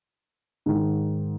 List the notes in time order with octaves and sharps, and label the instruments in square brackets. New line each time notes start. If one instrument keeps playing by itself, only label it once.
[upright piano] G#2 D#3